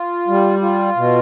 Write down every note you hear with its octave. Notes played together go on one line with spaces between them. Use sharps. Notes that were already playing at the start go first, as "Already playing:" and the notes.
Already playing: F4
G3
F4
B2